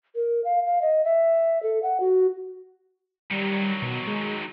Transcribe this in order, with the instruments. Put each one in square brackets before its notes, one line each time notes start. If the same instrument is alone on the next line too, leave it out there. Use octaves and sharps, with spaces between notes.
[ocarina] A#4
F5
F5
D#5
E5
A4
F#5
F#4
[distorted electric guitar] D#3 F#3 [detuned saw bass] G3
[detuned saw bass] B2
G#3